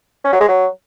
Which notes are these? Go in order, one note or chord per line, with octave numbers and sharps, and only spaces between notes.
C#4
F#3
G#3
F#3